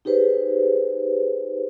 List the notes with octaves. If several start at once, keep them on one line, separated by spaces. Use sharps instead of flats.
D#4 G4 G#4 B4 C5